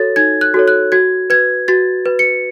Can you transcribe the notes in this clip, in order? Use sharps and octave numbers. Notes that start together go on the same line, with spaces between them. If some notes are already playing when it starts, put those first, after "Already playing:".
Already playing: F#4 A4 C#5 A6
D#4 G#6
F#6
F#4 A4 C#5
F#6
F#4 G#6
B4 G#6
F#4 A6
B4
C#7